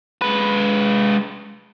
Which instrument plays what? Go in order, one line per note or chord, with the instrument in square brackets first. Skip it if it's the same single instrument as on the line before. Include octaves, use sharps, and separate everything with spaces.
[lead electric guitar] G#3 B4